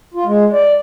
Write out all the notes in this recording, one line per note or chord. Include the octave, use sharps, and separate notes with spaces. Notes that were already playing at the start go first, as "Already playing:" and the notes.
F4
G#3
D5